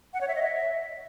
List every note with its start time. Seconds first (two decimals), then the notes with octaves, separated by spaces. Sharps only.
0.14 F#5
0.21 C#5
0.28 E5
0.35 D#5
0.43 E5